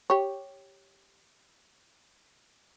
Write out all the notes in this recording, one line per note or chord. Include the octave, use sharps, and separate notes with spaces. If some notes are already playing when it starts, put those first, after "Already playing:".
G4 C#5